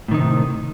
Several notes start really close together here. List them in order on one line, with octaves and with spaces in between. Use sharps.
A2 D#3 D#4 C3